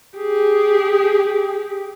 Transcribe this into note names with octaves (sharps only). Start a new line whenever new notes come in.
G4 G#4